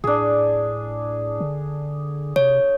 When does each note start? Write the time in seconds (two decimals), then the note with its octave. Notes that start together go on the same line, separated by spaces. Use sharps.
0.04 A2 D4 G#4
1.40 D3
2.36 C3 C#5